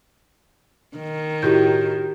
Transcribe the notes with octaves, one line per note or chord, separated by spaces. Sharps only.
D#3
A2 F#4 G4 G6